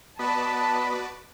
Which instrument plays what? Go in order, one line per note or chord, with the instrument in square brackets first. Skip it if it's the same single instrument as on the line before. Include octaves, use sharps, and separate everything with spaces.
[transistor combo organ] B3 D#5 B5 [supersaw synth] F#4 B4 D5 [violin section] A5